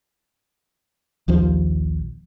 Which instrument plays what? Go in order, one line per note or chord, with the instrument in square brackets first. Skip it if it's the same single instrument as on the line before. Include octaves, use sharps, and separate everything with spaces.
[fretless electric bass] A#1 D#2 F3